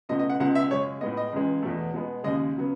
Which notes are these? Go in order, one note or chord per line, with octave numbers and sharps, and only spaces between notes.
C#2 B2 A3 D#5
D#5
F#5
C#2 B2 G#3 F#5
E5
F#2 C#3 G#3 C#5
A2 G#3 B3 D#5
D#5
C#2 C#3 E3 G#3
E2 B2 A3
B2 G#3 B3
D#2 C#3 G#3 D#5
C#3 F#3 B3